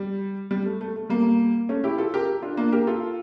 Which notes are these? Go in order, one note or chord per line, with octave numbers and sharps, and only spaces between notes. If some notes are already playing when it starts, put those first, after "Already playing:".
Already playing: G3
G3
A3
A3
A3
G3 A#3
A3 C#4
E4 G4
F4 A4
G4 A#4
D4 F4
A#3 D4
G4 A#4
F4 A4